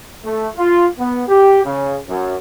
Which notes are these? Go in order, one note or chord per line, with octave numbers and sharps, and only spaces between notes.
A3
F4
B3
G4
C#3
F#2